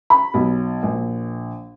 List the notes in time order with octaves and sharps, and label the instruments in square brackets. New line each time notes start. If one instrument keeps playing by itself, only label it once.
[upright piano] B5
B1
A#1